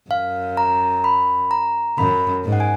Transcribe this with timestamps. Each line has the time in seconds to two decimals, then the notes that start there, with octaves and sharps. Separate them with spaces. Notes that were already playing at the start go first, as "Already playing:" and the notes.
0.11 F#2 F5
0.57 A#5
1.04 B5
1.51 A#5
1.98 F#2 B5
2.44 G#2
2.52 F#5
2.60 G#5